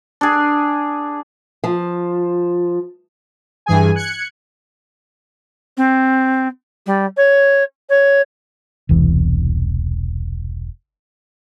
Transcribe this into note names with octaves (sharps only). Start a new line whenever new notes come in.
D4 G#4
F3
G2 E3 G#4 G#5
F#6 G#6 C#7
C4
G3
C#5
C#5
E1 C2 E3